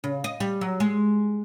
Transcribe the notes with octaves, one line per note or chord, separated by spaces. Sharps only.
C#3
D#5
G3
F#3
G#3